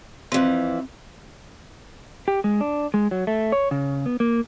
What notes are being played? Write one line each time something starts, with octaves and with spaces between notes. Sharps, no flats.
F2 E3 C4
G4
G#3
D4
G#3
F#3
A3
C#5
C#3
B3
A#3